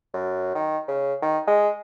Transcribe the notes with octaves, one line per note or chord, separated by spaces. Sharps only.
F#2
D#3
C#3
D#3
G#3